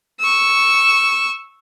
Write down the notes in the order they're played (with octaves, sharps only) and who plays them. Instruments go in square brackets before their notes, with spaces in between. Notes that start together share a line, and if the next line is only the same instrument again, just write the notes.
[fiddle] C#6 E6